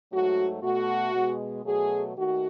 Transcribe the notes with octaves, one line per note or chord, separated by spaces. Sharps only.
G#2 F#3 A3 F#4
B2 A3 F#4
B2 G#3
B2 F#3 A3 G#4
D#2 D#3 A3 F#4